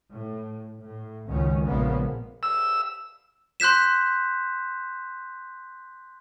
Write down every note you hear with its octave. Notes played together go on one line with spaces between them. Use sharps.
A2
A2
C#2 F#2 D#3 C#4
A#1 C#3 G#3 A#3 B3
E6
C6 F#6 G6 B6 E7